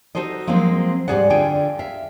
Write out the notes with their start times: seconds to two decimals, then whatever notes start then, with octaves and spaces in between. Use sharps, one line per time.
0.15 D#4 F4 F#4 A4 C5 D#5
0.47 F3 F#3 G#3 A#3 C4
1.08 G#2 F3 G3 G#4 D5 F#5
1.30 D3 F4 G#4 G5 G#5
1.79 E5 F5